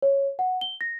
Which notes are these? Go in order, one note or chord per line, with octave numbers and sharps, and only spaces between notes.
C#5
F#5
G7
A#6